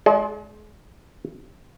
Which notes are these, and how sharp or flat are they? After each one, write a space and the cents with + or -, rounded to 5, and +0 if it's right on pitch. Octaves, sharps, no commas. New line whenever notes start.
G#3 +25 G#4 +40 D5 -20